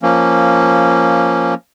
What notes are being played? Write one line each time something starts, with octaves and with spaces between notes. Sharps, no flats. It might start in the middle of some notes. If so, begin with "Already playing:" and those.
F3 A#3 C#4